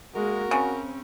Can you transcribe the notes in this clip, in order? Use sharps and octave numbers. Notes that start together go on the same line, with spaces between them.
G#3 A#3 F#4 A#4
C#3 C4 C#4